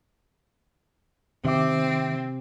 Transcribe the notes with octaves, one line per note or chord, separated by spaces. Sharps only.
C3 D#3 C4 E5 D6